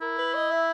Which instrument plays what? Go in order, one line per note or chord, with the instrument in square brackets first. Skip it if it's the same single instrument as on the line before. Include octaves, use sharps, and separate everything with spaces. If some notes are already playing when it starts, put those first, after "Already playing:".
[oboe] E4 [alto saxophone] A#4
[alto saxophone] B4
D#5
E5